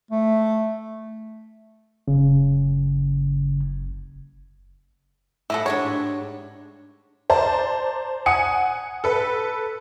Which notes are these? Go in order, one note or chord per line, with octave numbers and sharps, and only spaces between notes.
A3
F#1 C#3
A2 E4 A4 D#5 F#5
G#2 G3 D4 C#5
C5 D5 A5 A#5
F#5 G#5 D#6 C#7
A4 B4